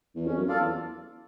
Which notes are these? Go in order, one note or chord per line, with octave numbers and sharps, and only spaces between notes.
E2
F2 C#4
F#2
F4 A4 D5 F5
E2